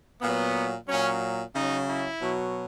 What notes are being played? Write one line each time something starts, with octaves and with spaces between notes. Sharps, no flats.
A#2 F#3 B3
A#2 F#3 C#4
C#3 F#3 D#4
E4
B2 F#3